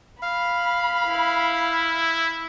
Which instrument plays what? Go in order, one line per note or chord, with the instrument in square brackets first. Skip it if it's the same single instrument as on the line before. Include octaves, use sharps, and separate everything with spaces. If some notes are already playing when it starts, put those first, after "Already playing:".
[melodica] F5 [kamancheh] B5
[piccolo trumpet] E4